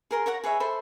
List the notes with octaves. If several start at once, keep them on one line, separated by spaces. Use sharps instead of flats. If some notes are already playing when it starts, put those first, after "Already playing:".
G#4 A#4 C6
A#4 C#5 F#5 A#5
G#4 B4 C#5 E5
A4 C5 E5 B5